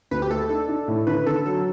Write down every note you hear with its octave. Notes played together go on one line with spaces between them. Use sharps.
D2 B4
G4
A3 A4
D4 A4
D4
A2
D3 B4
D3 A4
F#3 A4